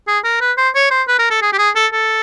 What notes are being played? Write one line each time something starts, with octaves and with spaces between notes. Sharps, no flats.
G#4
A#4
B4
C5
C#5
C5
B4
A#4
A4
G#4
G4
G#4
A4
A4